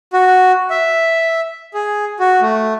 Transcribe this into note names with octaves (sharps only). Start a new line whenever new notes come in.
F#4
E5
G#4
F#4
A3